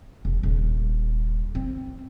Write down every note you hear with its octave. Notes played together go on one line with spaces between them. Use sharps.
E1
D#1
C4